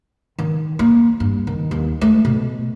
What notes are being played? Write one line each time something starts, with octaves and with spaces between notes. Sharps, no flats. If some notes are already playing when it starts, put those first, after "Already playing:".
D#3
A#3
G2
D#3
D#2
A3
B2